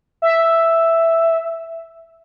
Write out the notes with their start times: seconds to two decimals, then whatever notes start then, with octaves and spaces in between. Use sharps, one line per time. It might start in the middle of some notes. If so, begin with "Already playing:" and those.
0.22 E5